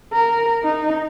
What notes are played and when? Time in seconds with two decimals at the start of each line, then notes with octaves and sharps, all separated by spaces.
0.13 A#4
0.63 D#4